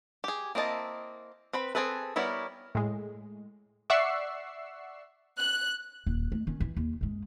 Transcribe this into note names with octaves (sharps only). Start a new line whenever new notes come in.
G4 G#4
A#3 C4 E4 D#5 A5
C4 B4 B5
C4 D#4 G#4 A4 B4
G3 B3 E4 A#4 C#5
A2 G#3
D5 E5 F#5 C#6 E6 C7
F#6
D#1
A3
D#3 C#4
E3
D#2
F#2 G#3